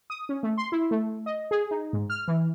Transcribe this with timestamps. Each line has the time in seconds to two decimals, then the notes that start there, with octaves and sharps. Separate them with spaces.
0.10 D#6
0.29 C#4
0.43 A3
0.58 C6
0.72 E4
0.91 A3
1.26 D#5
1.51 G#4
1.71 D#4
1.93 G#2
2.10 F6
2.28 E3